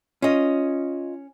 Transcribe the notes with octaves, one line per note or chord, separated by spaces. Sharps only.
C#4 F4 D#5